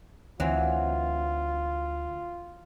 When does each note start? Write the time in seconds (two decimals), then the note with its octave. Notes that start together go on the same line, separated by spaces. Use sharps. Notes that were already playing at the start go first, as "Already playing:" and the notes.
0.40 D2 E3 F#3 C4 F4